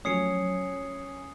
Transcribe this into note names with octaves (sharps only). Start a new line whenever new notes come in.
F3 F#3 A3 C#4 D#6 C7 C#7